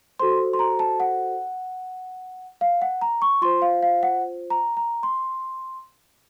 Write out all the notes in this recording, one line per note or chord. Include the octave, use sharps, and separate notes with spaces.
F#4 A4 C5 C6
C6
A#5
A5
F#5
F5
F#5
A#5
C#6
F4 C5 C6
F5
F5
F#5
A#5
A#5
C6